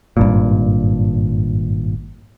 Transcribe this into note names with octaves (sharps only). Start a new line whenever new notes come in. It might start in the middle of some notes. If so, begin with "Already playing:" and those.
G#1 G2 A#2